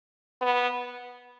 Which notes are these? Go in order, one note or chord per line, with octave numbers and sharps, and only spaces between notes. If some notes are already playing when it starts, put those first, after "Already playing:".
B3